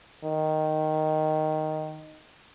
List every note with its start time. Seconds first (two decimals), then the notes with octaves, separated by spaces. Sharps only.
0.24 D#3